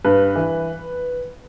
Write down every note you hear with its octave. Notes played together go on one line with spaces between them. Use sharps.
G2 B4
E3